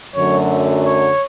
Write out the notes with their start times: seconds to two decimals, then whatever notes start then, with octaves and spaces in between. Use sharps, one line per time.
0.15 F#2 D3 F#3 A3 C#5
0.85 C#5